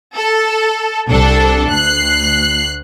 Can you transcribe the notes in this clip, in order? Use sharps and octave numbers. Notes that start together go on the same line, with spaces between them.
A4
C2 D4 A4
D2 F#6 C7